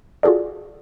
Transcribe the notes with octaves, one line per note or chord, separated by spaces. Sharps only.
F4 F#4 G#4 A4 D5